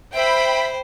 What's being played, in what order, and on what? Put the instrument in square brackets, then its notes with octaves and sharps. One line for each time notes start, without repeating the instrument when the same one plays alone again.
[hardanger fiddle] C5 [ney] E5 [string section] G5 B5